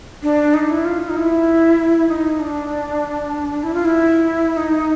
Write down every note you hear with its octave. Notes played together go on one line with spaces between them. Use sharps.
D4
D#4
E4
F4
D#4
E4
D#4
D4
E4
F4
E4
D#4